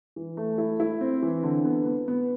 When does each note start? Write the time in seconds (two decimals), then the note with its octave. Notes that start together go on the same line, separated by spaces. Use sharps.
0.16 E3
0.37 A3
0.58 E4
0.80 E4
1.01 C4
1.22 E3
1.43 D3
1.65 B3
1.86 B3
2.08 B3